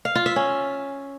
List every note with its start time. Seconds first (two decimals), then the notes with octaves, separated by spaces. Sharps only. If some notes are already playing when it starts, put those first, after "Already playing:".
0.05 F5
0.15 F4
0.26 E5
0.36 C#4